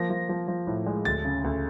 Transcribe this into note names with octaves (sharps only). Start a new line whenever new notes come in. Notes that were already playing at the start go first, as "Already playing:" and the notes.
Already playing: F3 A#3 A#6
F3
F3
F3
A2
G#3
D2 A6
C#3
D2